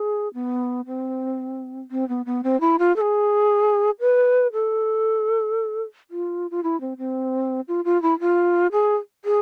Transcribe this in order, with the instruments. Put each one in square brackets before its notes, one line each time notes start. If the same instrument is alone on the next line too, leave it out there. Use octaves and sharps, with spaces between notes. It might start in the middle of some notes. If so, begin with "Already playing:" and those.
Already playing: [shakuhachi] G#4
B3
C4
C4
B3
B3
C4
E4
F4
A4
G#4
B4
A4
F4
F4
E4
C4
C4
F4
F4
E4
F4
G#4
G#4